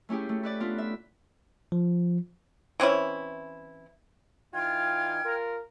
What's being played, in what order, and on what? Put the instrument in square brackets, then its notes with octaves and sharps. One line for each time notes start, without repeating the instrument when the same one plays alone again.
[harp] A3 C#4 E4 G4 G#4
A3
E4 B4 D5
B3 D4 F4 B4
E5
[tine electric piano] F3
[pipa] E3 C4 C#4 E4
[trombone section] E3 D#4 F4 [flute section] G5 F6 G#6
[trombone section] F4 A#4